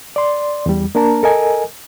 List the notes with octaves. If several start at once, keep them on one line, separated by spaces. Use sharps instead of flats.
D5 C6
E2 G3
A#3 D4 A#4 A5 A#5
A4 A#4 D#5 G#5